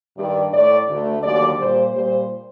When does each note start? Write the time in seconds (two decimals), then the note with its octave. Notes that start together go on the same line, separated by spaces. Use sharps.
0.17 G2 D#3 G3 D5
0.53 A2 A3 D5
0.89 D2 D3 A3
1.23 D#2 D3 F#3 D5
1.59 A#2 G3 C5
1.94 A#2 G3 C5